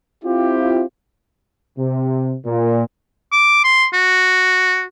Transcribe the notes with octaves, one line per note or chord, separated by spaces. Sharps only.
C4 E4 F4 G4
C3
A#2
D6
C6
F#4